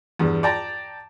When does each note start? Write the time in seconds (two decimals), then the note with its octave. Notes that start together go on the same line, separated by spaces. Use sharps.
0.19 E2 G2
0.43 D5 G5 A5 A#5